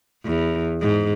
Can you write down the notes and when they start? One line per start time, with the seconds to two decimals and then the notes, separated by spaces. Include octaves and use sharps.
0.24 E2
0.82 G#2